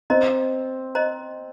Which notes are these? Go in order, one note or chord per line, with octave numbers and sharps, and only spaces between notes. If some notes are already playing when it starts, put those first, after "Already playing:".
C4 C5 D#5 A#5
C5 D#5 A#5